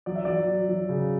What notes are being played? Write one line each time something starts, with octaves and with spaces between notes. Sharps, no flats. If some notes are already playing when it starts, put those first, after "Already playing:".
F#3 D5
E5
F#3 D5
F#3
F#3
C#3